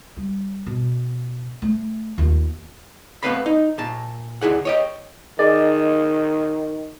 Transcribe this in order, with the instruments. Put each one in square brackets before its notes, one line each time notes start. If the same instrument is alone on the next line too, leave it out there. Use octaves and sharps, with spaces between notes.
[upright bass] G3
B2
A3
D#2 F4
[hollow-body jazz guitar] A3 B3 C4 B4 F5 B5
D#4
A#2 A5
D2 E4 G#4 F#5
C#5 D#5 G5
[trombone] D#3 [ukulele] G#4 D5 D#5